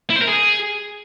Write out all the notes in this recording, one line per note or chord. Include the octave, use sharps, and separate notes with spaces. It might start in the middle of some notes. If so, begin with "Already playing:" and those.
E4
C5
A#4
G#4